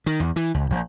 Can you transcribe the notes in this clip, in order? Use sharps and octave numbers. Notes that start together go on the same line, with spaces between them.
D#3
E2
E3
C#2
A#1